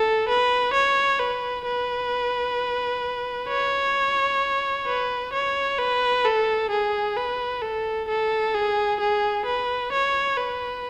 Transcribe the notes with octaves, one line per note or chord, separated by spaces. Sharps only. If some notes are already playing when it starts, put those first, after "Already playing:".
Already playing: A4
B4
C#5
B4
B4
C#5
B4
C#5
B4
A4
G#4
B4
A4
A4
G#4
G#4
B4
C#5
B4